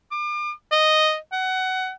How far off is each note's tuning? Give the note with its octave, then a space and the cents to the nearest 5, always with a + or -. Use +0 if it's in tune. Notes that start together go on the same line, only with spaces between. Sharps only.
D6 +40
D#5 -5
F#5 +20